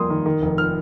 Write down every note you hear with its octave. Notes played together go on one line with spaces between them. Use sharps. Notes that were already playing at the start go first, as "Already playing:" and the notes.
Already playing: F2 G3 A#3 C6 D#6
D#3
D#3
F1
F6